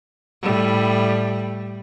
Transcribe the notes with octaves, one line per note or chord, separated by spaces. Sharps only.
A2 G3